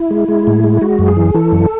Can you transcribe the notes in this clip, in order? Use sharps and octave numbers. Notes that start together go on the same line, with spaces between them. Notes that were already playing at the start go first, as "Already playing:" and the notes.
Already playing: E4
G#3
G#3
A2
G#3
G#3 F#4
F#2
G#4
E3
E3 A4
F#2